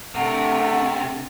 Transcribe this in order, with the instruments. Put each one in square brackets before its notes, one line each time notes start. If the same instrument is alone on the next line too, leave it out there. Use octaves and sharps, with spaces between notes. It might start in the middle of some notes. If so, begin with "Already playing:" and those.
[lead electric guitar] C3 [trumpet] A3 [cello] D4 A#4 [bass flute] F#5